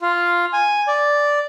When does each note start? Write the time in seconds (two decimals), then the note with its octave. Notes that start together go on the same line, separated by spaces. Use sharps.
0.01 F4
0.53 G#5
0.87 D5